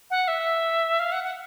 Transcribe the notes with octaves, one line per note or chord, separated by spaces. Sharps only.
F#5
E5
F5
F#5
F#5